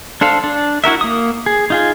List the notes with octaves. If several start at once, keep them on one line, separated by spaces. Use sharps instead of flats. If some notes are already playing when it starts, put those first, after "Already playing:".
D4 A4 C5 F5
D4
E4 F#4 A#4 E5
A#3 D#6
G#4
D#4 F4 G#4